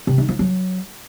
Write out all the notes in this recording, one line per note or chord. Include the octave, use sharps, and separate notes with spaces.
C3
D#3
F3
F#3